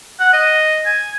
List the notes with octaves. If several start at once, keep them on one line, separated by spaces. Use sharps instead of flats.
F#5
D#5
G#5